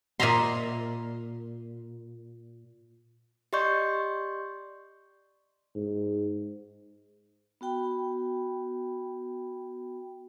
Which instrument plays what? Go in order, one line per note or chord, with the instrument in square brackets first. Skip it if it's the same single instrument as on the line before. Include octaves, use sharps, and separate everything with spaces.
[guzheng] A#2 D#5 E5 A#5 C6
[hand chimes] G4 D5 D#5 C6 C#6 G6
[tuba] G#2
[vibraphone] B3 F#4 G5 B5